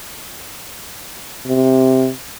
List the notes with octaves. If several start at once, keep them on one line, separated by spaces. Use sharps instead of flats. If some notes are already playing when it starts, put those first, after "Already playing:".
C3